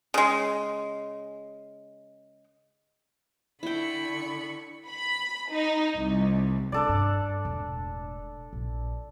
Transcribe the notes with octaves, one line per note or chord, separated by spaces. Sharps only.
C#3 G#3
D3 E4 G5 B5 C#6
B5
D#4
C2
C3 D4 A4 D5
G2
E1 A2
A#1